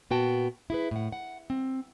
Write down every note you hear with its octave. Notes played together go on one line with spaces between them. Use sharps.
A#2 B3 F#4 G5 A5
E4 G#4 B4
A2 F#5
F#5
C4